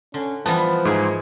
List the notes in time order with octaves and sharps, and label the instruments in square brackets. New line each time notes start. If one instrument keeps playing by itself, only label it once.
[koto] D3 [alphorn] C#4
[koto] E3 G3 B3 [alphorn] F3 [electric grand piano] A5 B5
[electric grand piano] G#2 [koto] E4 G#4 A#4